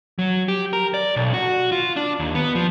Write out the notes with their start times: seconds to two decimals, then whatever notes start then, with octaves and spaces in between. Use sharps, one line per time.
0.19 F#3
0.48 G4
0.73 A#4
0.94 D5
1.16 B1
1.34 F#4
1.72 F4
1.96 D4
2.20 D#2
2.35 B3
2.55 F3